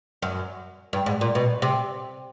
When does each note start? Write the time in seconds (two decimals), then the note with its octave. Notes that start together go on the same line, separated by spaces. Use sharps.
0.22 F#2
0.93 G2
1.06 G#2
1.21 A#2
1.35 B2
1.62 C3